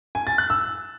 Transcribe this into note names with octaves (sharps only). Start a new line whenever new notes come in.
G#5
A6
F#6
E6